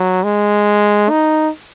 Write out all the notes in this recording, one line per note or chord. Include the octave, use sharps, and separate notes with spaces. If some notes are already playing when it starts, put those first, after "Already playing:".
Already playing: F#3
G#3
D#4